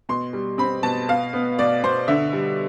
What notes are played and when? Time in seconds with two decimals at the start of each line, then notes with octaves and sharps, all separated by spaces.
0.09 B2 C6
0.33 G3
0.58 C4 B5
0.83 B2 A5
1.08 B3 F5
1.33 B3
1.59 B2 D5
1.83 B2 C5
2.08 D3 E5
2.33 G3